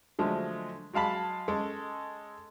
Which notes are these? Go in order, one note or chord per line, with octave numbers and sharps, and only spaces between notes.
D3 F3 F#3 G#3 A3
F#3 G#3 F5 A5 B5
G#3 C#4 A4